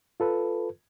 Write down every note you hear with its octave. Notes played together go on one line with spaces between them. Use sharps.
F4 A4 B4